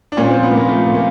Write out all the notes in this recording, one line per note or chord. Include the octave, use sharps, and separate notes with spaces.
D4
A#2 C#4
C4
F3
B3
A#2 A#3
F3 A3
A#2
A#3